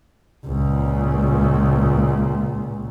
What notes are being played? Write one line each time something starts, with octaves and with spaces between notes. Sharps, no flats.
C#2 A#2